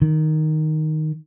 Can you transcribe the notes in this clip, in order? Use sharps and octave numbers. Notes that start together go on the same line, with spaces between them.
D#3